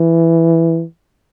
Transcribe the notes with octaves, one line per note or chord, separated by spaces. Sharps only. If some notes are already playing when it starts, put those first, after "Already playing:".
Already playing: E3